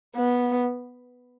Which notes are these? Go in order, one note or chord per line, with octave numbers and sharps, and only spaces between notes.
B3